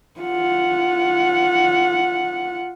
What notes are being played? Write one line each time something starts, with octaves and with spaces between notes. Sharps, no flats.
F4 F#5